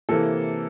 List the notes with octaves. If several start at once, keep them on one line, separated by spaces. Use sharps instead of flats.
C3 E3 A#3 A4